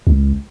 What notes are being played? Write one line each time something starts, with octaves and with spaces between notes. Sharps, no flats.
C#2